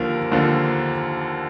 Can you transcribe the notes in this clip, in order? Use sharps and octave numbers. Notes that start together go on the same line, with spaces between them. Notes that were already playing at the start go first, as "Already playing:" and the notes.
Already playing: D#2 D3 F3 A#4
D#2 D3 F3